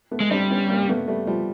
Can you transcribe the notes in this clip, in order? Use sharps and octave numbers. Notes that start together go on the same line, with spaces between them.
A3 B3
G#3
G3 C4 D4
B3 C#4
A#3 C4
A3 B3
G3 A3
F3 G3